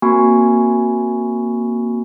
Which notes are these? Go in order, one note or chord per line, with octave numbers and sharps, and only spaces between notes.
A#3 C4 F#4 G#5 B5 C#6